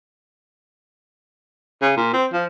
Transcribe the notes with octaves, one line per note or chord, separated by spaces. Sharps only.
C#3
A#2
C4
F3